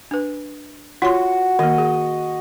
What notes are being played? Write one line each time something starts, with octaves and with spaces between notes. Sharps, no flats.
D4 B4
F4 F#4 C#5 C6
D#3 A#3 D#5
G#4